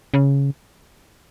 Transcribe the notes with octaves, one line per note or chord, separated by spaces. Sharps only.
C#3